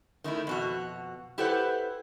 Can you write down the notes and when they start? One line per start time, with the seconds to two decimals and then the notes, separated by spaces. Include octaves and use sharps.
0.24 D#3 A3 D#4 E4
0.47 F2 B2 F#4
1.38 E4 G4 A4 B4 C5 F#5